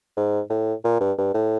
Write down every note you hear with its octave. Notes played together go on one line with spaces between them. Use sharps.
G#2
A2
A#2
G2
G2
A2